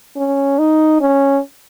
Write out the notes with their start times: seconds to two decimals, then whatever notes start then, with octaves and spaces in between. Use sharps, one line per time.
0.17 C#4
0.58 D#4
1.01 C#4